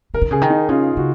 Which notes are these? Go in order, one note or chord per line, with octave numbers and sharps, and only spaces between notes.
C#3 A#4
D#3
C#3 G#4
D#3
D#4
C#3 F4
C#3 F#4